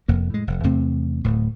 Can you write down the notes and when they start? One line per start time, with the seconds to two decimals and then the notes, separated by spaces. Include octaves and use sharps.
0.08 F1 F2 A#3
0.30 A2 G#3
0.47 F1
0.64 E2 C3 A3 C4
1.24 D1 A2